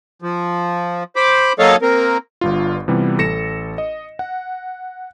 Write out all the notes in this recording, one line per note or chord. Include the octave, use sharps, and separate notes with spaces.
F3
C5 B5 D6
F#3 A#3 A4 C#5 D#5 F5
A#3 C4 A#4
G1 G2 F4
C3 E3 G3 B3 F4
A1 A4 A#6 C#7 E7
D#5
F#5